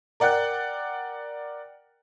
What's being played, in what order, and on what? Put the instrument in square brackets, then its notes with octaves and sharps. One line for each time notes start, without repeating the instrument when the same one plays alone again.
[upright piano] A#4 D5 F#5 G5 F#6